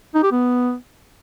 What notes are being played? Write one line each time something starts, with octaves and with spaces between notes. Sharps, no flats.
D#4
G4
B3